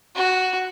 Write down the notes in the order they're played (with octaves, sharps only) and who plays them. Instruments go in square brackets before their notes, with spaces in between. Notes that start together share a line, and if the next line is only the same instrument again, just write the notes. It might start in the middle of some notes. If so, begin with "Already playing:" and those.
[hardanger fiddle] F#4